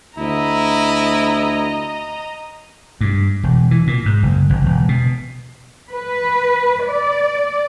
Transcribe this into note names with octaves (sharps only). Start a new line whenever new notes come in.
D2 E4 D#5 A#5
G2
E1
E3
A#2
G#2
F#1
G1
E1
B2
B4
D5